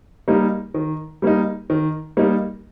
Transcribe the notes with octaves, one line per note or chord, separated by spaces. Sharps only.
G3 A#3 D#4
D#3
G3 A#3 D#4
D#3
G3 A#3 D#4